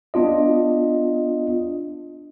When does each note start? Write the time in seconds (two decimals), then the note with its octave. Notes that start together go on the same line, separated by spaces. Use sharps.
0.14 B3 D4 F4 D#5